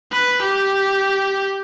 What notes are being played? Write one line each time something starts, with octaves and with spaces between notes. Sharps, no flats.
B4
G4